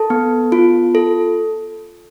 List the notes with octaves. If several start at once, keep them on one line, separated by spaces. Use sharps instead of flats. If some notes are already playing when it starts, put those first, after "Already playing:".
Already playing: A4 A5
B3
F4
A4